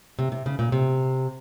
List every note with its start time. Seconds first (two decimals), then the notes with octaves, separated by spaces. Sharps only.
0.19 C3
0.32 C3
0.46 C#3
0.59 A#2
0.72 C3